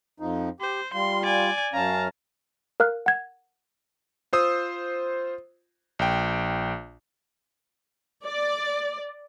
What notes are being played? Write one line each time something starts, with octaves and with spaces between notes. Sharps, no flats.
F2 F3 D#4
G4 C5
G3 F4 C6
D5 G#5
F#2 C#4 F5 A5 A#5
A#4 F5 F6 F#6
F#5 G#6
F4 C5 D#6 E6
A#1 G5
D5